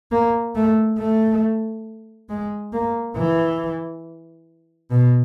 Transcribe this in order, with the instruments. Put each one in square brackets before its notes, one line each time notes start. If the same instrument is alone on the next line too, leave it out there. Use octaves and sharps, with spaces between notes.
[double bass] A#3
A3
A3
G#3
A#3
E3
B2